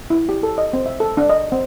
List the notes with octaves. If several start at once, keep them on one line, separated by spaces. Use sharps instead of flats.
E4
G4
A4
D#5
C4
E5
A4
D4
D#5
C4